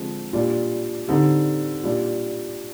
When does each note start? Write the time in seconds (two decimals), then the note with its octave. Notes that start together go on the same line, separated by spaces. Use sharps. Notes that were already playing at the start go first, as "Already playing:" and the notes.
Already playing: D3 F3 G#3 C4
0.33 A#2 G3 D4
1.08 D3 G3 C4 D#4
1.84 A#2 G3 D4